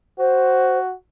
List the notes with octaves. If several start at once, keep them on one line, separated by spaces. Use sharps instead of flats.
F#4 C5